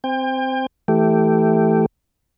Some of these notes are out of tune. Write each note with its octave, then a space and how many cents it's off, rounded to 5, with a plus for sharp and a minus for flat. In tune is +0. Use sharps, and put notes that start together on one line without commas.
C4 -10 G5 +35
E3 -5 A3 +0 G4 -10